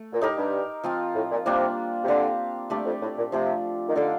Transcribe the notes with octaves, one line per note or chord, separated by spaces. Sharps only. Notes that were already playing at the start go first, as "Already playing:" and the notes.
Already playing: A3
A#2
A2 D#4 G4 A#4
G2
F3 C4 F4
A2
A#2
C3 G3 A#3 D4 F4
C3
D3 C4 G4 C5 F5
G2 A3 D4 G4 D5
F2
A2
A#2
C3 F3 A3 D4
D#3
D3 D#4 A4 D5 F5